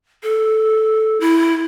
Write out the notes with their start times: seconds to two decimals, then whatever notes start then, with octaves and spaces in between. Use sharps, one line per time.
0.23 A4
1.20 E4